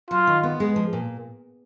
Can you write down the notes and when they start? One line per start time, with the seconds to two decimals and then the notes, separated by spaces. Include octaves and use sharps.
0.10 F#3 F4
0.27 D#3
0.43 B3
0.60 G#3
0.76 F3
0.93 A#2